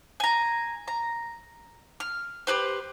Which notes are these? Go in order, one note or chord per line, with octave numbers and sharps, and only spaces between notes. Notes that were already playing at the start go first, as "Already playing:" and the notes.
G#5 A#5
A#5
F6
G4 G#4 B4 C5